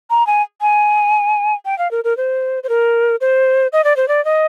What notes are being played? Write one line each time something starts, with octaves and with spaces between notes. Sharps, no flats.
A#5
G#5
G#5
G5
F5
A#4
A#4
C5
C5
A#4
C5
D#5
D5
C5
D5
D#5